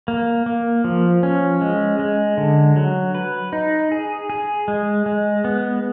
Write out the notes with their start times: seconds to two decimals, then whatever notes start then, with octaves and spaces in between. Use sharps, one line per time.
0.08 A#3
0.46 A#3
0.84 F3
1.23 C#4
1.61 G#3
1.99 G#3
2.37 D3
2.76 F#3
3.15 B4
3.53 D#4
3.92 G#4
4.30 G#4
4.68 G#3
5.06 G#3
5.45 B3